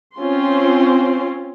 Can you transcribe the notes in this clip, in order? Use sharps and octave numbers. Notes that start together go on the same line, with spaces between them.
C4 C#4 F4 C6